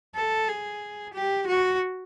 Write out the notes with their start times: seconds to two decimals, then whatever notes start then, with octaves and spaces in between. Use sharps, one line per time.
0.15 A4
0.48 G#4
1.14 G4
1.47 F#4